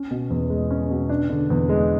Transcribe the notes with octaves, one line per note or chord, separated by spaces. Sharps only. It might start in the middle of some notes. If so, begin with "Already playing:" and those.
Already playing: C#4
B2
E2
G#3
C#4
B2
D4
D3
E2
G#3